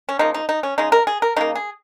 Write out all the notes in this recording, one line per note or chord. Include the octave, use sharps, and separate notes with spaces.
C#4
C#3 F3 A#3 D#4
D#4
D#4
C#4
C#3 G#3 D#4
A#4
G#4
A#4
C#3 A#3 D#4
G#4